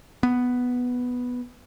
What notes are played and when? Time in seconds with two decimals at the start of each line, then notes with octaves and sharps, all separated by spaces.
0.23 B3